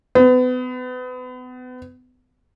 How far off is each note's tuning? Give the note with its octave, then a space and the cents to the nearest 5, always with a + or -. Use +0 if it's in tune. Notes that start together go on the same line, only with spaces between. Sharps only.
B3 +35